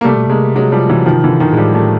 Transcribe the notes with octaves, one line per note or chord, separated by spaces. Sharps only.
A#3
C3 G3 A3
B2
C3 G#3 A#3
F#3 G#3
F3 G3
E3 F#3
D#3 F3
D3 E3
D#3 F3
A#2 G#3
A2 F3 G3
G3 A3